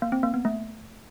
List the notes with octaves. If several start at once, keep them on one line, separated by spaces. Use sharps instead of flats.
A#3
C4
A#3
B3
A3